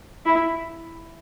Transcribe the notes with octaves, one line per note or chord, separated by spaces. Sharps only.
E4